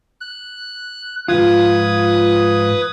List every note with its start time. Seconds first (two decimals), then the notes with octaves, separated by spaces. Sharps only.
0.21 F#6
1.28 G#2 F3 F4 B4 D#6 G#6